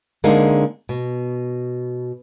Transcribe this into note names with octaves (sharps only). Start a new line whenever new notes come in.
D3 G#3 A#3 C4 D4 D#4
B2